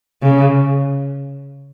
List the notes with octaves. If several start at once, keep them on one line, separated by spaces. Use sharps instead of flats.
C#3